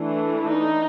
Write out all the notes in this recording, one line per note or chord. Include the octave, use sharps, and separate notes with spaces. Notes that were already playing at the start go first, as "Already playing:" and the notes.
Already playing: E3 A3 D4
D#4